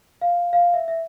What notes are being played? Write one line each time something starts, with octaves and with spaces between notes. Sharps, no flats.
F5
F5
E5
E5